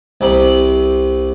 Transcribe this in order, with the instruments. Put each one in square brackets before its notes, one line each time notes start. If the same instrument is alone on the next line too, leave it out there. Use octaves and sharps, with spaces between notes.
[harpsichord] C2 C3 B5